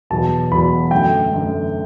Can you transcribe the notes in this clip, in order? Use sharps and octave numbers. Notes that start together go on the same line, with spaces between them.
E2 B2 F#3 A5
E2 B2 F#3 B5
F#2 D3 A3 G5
F#2 D3 A3